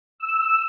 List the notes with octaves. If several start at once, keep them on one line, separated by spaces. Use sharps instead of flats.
E6